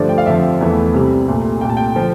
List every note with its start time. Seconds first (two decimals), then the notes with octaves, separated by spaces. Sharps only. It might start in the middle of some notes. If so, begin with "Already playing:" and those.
Already playing: G2 D3 F3 A3 D5
0.09 G5
0.18 F5
0.26 F2 D3 F3 E5
0.61 E2 E3 A3
0.94 C2 C3 G3
1.28 C2 A#2 A3
1.61 C2 A#2 A3 G5
1.70 A5
1.77 G5
1.95 D3 F3